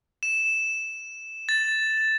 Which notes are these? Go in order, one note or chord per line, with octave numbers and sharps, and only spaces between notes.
E7
A6